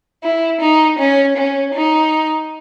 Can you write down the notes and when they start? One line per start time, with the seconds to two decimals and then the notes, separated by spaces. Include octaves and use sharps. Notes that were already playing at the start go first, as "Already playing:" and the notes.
0.23 E4
0.61 D#4
0.99 C#4
1.37 C#4
1.74 D#4